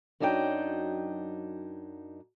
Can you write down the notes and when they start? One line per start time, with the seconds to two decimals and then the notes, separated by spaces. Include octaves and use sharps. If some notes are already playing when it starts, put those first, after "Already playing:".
0.20 F#2 F#3 D4 D#4 G#4 G5